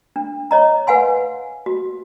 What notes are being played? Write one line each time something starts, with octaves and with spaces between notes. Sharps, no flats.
D4
C#5 D#5 A#5
B4 F5 F#5 G#5 C6
F#4